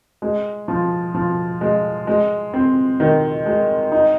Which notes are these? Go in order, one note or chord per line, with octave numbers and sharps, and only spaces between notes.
G#3
F3
F3
G#3
G#3
C4
D#3
G#3
D#4